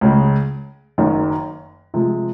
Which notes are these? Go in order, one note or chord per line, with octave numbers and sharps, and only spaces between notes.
C#2 C#3 G#3
F#1 F#2 D#3
C3 F3 G#3